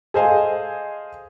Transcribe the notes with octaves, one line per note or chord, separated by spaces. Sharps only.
G#4 A4 C5 D#5 F5 G#5